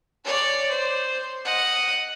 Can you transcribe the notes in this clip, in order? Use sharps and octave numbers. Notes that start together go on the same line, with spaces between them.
C#5 D5
C5
D#5 F#5